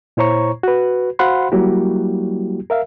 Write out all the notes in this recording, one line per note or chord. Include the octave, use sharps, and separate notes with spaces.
A#2 E4 C5 C#5 A#5 C#6
F#4 B4
F#4 C5 F5 F#5 B5 C6
F#3 G3 A#3 E4 F#4 G4
A#4 E5 F5